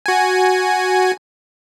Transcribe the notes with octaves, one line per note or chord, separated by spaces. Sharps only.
F#4 G#5